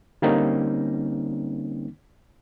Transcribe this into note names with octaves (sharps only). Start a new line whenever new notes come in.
D3 G3 A#3 C4 C#4 D#4